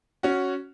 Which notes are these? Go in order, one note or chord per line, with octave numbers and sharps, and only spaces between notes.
C#4 F#4